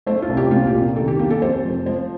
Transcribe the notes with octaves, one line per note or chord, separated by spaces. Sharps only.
A3 C5
F4
C2
G4
A#2 F4
G4
C2
D#3 A4
G4
A#3 G4
A4
F2 C5
F1
F3 C5